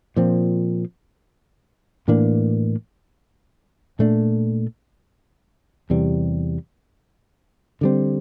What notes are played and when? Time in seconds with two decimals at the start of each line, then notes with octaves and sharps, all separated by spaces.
0.17 A#2 F3 C4
2.08 A2 E3 A#3 D4
3.99 A#2 A3 D4
5.90 E2 C3 E3 G3
7.81 D3 G3 C4